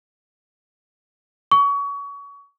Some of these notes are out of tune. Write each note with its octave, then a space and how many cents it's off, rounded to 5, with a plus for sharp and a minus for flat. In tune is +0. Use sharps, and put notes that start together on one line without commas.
C#6 +30